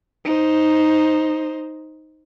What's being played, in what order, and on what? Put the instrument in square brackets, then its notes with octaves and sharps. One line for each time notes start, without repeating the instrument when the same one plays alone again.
[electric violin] D#4 C5